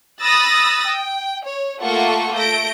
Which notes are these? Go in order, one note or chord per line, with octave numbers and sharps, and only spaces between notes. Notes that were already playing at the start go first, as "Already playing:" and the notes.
B5 D#6 E6 F#6 A6 A#6
G5
C#5
A3 A#3 F4 A4 F#5 C#6
A3 G6 A#6 D7